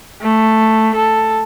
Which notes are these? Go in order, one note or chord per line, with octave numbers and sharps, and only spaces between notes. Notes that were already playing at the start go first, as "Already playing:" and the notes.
A3
A4